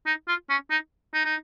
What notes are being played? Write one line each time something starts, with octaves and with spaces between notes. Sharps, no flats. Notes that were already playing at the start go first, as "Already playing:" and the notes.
D#4
F4
C#4
D#4
D#4
D#4